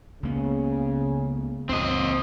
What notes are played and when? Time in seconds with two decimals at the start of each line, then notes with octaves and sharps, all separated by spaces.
0.23 C#2 C#3 A#3 B3
1.69 C#2 A#2 C4 D#5